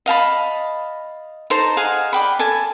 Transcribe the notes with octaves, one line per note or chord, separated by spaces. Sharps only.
D#5 F5 A5 B5
D#4 A4 C5 A#5
G#4 D#5 F5 F#5
D5 G5 B5
A4 G#5 A5